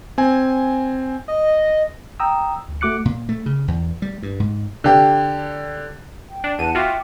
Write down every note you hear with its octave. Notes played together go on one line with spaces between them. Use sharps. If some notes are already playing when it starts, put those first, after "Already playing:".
C4 G#5
D#5
G5 A#5 D#6 E6
D2
A3 F#4 D6 F#6 C#7
A#2
A3
C#3
E2
G3
G2
G#2
D3 G4
G5
D4
E2 F#5 A5 D#7
F4 F#4 E5 G5 D6